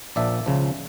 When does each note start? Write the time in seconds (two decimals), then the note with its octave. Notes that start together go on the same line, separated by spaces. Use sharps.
0.16 A#1 A#2 F3 D5 E5
0.46 C#2 C#3 F3